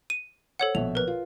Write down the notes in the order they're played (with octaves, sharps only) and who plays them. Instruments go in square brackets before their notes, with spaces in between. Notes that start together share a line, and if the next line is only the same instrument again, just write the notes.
[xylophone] D#7
[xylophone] A4 C#5 F#5 [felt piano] C5
[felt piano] A#1 B2 E5 [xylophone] F7
[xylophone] A#4 B4
[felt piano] F4